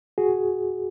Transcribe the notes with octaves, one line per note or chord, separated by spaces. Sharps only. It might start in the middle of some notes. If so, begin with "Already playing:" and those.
F#4 G#4